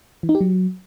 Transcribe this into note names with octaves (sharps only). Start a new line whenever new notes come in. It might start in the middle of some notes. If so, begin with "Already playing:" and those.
E3
D#4
G4
F#3